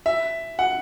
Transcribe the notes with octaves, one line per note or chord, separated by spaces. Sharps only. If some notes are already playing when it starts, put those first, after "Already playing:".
E5
F#5